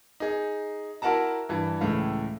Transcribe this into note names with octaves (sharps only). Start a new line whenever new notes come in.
D#4 G#4
E4 F#4 A#4 F#5 A5 A#5
G2 E3
C#2 A2 E3 A3 E4 F5